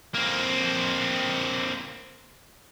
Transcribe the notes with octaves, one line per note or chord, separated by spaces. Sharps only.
A#3 C4